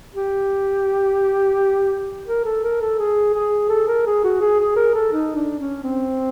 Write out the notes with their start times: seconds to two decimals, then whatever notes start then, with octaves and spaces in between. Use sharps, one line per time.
0.14 G4
2.28 A#4
2.45 A4
2.63 A#4
2.81 A4
2.99 G#4
3.34 G#4
3.70 A4
3.88 A#4
4.06 G#4
4.24 F#4
4.41 G#4
4.60 G#4
4.76 A#4
4.94 A4
5.13 D#4
5.35 D4
5.60 C#4
5.83 C4